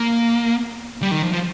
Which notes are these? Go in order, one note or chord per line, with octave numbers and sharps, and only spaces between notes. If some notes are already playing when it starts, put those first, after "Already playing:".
Already playing: A#3
G3
D#3
F3
F3